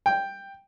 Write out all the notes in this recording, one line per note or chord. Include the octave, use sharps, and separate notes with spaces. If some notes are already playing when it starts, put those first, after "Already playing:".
G5